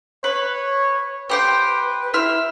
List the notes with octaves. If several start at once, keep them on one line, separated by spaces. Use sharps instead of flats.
B4 C#5
G4 B4 C5 G5
E4 E5 C6 F6